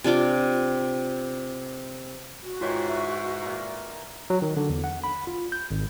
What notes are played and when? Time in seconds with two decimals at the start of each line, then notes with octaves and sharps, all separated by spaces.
0.04 C3 D4 F4 D6
2.43 F#4
2.61 G#2 D#3 E3 F4 C#5 C6
2.89 E5 C#6
3.41 A#2 A#5
4.30 F#3
4.42 D#3
4.57 D3
4.70 E2
4.84 F#5
5.04 B5
5.27 F4
5.52 G6
5.71 G#1